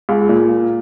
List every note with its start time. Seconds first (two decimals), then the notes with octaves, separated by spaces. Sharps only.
0.09 C#2
0.29 A#2